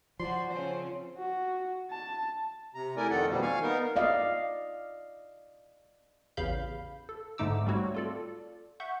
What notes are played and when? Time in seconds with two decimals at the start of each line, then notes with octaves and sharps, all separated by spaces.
0.20 F3 F#4 D5 C6
0.50 C#3 C4 C#4 C5
1.18 F#4
1.91 A5
2.74 C3 A#5
2.97 A3 E4 A#4 D5 G#5
3.10 F2 D#3 A4 D5 F#5
3.29 B2 D#3 F3 G3 A#3
3.42 F5 G#5 C#6
3.62 B3 D#4 A#4
3.96 D5 D#5 F5
6.37 A1 E2 C#3 F5 B5 G6
7.09 A4
7.38 G#2 D3 A3 D#4 D6 E6
7.66 G3 A3 C4 F#4 C#5
7.95 F4 A4 D5
8.80 E5 F#5 C#6 G6